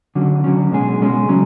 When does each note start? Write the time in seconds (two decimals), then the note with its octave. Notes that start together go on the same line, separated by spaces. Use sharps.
0.15 D3 F#3 C#4
0.44 D3 F#3 C#4
0.72 B2 G#3 C#4 G#4
1.00 B2 G#3 C#4 G#4
1.29 C#3 F#3 C#4